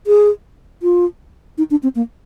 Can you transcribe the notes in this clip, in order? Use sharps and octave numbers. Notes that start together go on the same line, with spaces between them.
G#4
F4
D#4
D4
C4
A#3